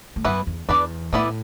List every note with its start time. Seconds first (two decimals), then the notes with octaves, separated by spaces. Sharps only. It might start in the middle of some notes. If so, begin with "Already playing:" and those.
0.16 A2
0.24 F#2 E3 B3 E4 B4
0.47 E2
0.69 E2 D4 B4 D5
1.12 A2 E3 B3 E4 B4 D5